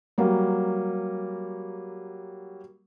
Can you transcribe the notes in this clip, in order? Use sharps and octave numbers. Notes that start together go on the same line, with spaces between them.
F#3 G3 A#3